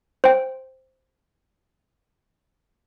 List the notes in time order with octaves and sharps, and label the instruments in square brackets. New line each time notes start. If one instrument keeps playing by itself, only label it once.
[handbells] C5 G5